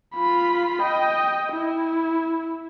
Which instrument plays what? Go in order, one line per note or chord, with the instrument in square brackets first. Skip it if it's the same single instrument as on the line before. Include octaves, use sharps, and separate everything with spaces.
[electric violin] F4 B5
D#5 G5
E4